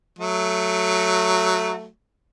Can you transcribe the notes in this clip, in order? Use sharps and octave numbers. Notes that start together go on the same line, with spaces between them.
F#3 A3